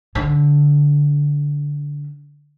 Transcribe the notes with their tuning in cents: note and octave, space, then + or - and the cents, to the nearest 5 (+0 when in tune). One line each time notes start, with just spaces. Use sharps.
D3 -15